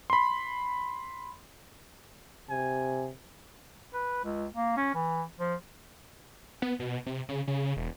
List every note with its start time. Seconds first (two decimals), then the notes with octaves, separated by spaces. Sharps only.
0.10 B5 C6
2.50 C3 G#5
3.93 B4
4.24 C#2
4.55 A#3
4.77 C#4
4.95 E3
5.40 F3
6.62 B3
6.80 B2
7.06 C3
7.29 C#3
7.47 C#3
7.77 E1